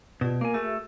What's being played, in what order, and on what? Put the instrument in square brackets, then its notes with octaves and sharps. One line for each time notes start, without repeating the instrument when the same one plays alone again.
[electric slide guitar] B2 [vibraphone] F4 G4 D5
[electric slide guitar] A#3 G#5 [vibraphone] A#4
[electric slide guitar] A3 [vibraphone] F#4 G#4 E5